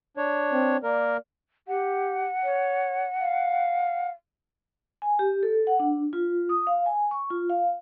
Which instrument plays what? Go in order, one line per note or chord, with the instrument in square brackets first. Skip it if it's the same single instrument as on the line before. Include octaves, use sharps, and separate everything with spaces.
[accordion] D4 C#5
[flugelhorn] C4
[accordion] A#3 A#4 [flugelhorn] D5
[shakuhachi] G4 [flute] F#5
[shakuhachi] C#5
F5
[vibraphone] G#5
G4
A4
F#5
D4
F4
D#6
F5
G#5
C#6
F4
F5